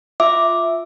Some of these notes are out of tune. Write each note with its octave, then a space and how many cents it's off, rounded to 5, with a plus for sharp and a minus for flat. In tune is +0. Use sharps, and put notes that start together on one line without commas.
F4 +0 E5 +0 D6 +0